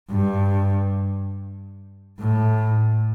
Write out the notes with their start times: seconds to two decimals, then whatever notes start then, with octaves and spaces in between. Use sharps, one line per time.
0.10 G2
2.19 A2